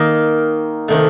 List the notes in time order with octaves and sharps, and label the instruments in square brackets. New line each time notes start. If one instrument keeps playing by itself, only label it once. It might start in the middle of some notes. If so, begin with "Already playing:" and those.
Already playing: [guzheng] D#3 A#3 D#4 A#4
C3 D#3 A3